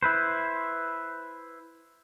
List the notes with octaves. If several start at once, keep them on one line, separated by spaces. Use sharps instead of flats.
E4 B4 C5